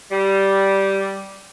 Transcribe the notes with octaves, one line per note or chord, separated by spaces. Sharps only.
G3